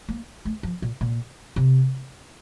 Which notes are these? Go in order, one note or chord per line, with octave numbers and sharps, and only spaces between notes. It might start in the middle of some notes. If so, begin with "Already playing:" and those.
A#3
A3
F3
A#2
A#2
C3